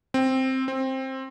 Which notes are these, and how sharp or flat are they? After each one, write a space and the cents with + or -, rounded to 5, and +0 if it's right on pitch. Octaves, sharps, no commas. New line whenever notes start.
C4 +5
C4 +15